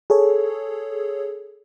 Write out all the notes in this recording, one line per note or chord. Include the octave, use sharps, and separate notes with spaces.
G#4 A4 C#5